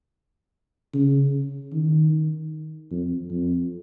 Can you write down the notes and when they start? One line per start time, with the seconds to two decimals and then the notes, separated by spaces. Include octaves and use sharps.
0.94 C#3
1.73 D#3
2.91 F2
3.31 F2